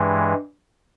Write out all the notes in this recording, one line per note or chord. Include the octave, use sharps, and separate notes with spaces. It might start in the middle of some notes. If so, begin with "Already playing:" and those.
Already playing: G2 E3 G#3